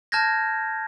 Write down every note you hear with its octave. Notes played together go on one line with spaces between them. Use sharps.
A5 F6 G6 G#6 A#6